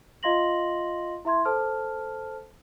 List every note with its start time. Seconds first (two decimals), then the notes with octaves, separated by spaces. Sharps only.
0.23 F4 D#5 F5 C6 A#6 F#7
1.25 E4 E5 C6 G#6
1.45 A4 C5 A5 F6